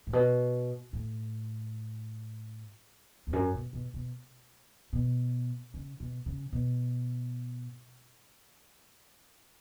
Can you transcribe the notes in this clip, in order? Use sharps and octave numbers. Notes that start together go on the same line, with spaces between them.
A2
B2
A2
E2
F#2
B2
B2
B2
B2
C#3
B2
C#3
B2